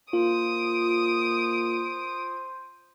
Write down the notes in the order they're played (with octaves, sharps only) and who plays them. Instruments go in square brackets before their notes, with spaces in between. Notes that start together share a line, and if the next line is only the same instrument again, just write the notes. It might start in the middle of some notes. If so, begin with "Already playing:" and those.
[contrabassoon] A#2 [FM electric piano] F4 [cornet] C5 [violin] D#6 D7